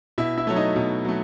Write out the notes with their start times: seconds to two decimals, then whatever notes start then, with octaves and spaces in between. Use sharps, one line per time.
0.18 B2 E4 E5
0.38 E4 E5
0.47 F#3 A3 C#5
0.56 D#4 D#5
0.76 B2
1.05 F#3 A3